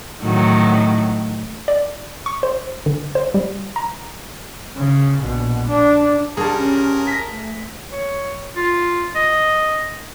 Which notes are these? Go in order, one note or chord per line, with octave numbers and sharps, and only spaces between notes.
A2 D#3 F#3
D5
C#6
C5
D3
C5
G3
A#5
C#3
A#1 B2
D4
C2 G3 D4 G#4 A#4 A5
C#4
A#6 B6
A3
C#5
F4
D#5